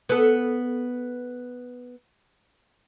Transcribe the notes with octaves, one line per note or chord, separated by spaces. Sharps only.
B3 A4